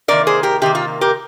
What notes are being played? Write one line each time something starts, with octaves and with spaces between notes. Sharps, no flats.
C3 D#3 A#3 A#4 D5
G#4 C5
G4 A#4
C3 D#3 A#3 G4
F4
G4 A#4